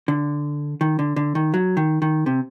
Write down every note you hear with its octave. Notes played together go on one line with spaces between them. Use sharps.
D3
D#3
D3
D3
D#3
F#3
D#3
D#3
C3